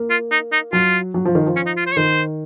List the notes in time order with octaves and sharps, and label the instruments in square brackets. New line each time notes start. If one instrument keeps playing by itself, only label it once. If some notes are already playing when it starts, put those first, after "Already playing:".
Already playing: [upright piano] A#3
[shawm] F4
D#4
D#4
[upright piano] F#3 [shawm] F4
[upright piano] F#3
F3
D#3
F3
[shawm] C#4
D#4
F4
C5
C#5
[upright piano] D#3 [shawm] C5